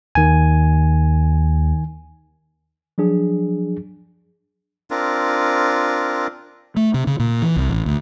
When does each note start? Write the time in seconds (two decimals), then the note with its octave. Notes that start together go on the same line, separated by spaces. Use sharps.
0.15 D#2 D#3 G#5
2.98 F3 F#3 D4 G#4
4.91 C4 D4 F4 A#4
6.76 A3
6.94 C3
7.07 C#3
7.19 A#2
7.42 E3
7.56 C2
7.69 A1
7.86 D2